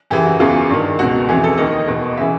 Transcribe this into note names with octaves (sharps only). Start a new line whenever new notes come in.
F#2 C#3 E3 G4
F#4
E2 C#3 E3 F4
G2 D#3
C#2 B2 F#4
F2 C#3 E3 G#4
A4
D#2 D#3 D#5
E2 B2
C#3 E3 E5